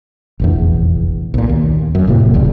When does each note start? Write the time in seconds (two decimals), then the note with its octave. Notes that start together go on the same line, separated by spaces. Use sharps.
0.40 F1 A#1 E2
1.34 B1 A#2
1.49 D#2
1.95 F#2
2.07 F1 A2 C3 A#3
2.34 D#1 C2 C#3 G3